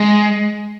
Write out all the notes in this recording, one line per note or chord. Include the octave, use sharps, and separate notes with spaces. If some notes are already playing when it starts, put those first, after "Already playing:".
Already playing: G#3